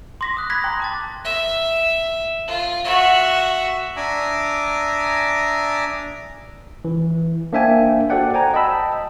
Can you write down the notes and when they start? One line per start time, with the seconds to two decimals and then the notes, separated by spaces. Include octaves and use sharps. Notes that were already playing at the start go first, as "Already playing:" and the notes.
0.21 C6 D6 A#6 B6
0.37 D#6 F#6
0.50 B5 F#6 G#6 A#6 B6
0.64 G5 A#5 C6
0.80 A5 D6 A6
1.24 E5
2.48 F4
2.84 F#4 E5
3.97 D4 E5 G#5 A#5 D6 D#6
6.85 E3
7.53 A#3 D4 C5 E5 G5 G#5
8.10 F#4 A4 C5 D5 F#5 G5
8.34 C5 G5 G#5 A#5
8.54 D#5 G5 A5 B5 E6